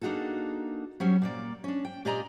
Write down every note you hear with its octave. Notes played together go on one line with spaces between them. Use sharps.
A#3 D4 D#4 F#4 G#4 A4
F#3 G3 C#4
A#2 A#3 D5
C#4 D4
G5
A#2 G4 D5 D#5 G#5 A#5